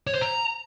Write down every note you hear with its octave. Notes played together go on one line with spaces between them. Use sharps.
C#5
C5
A#5